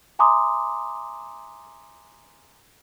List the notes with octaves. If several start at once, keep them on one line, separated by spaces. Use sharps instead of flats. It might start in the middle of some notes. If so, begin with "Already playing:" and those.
E5 G#5 A#5 C6 D6 D#6